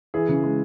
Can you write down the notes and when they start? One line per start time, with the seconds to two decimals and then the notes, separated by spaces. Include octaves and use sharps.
0.14 E3 G#4
0.29 C#3
0.44 G#3